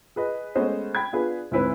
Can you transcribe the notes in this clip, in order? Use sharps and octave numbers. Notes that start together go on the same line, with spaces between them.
G#4 B4 D#5
G#3 A3 B3 C#4 C5 D#5
G5 B5 G#6
B3 D4 F4 G#4 B4
D2 G#2 C4 E4 B4 C5